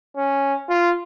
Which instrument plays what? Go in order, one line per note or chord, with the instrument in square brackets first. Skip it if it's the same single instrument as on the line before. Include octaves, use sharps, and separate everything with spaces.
[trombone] C#4
F4